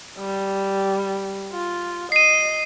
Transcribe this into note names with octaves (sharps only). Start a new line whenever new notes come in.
G3
F4
D#5 C7 D#7